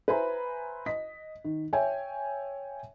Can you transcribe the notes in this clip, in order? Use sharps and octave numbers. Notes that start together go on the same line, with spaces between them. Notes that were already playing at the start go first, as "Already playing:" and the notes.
B4 C5 E5 G#5 A#5 B5
D#5 B6
D#3
C#5 E5 G5 G#5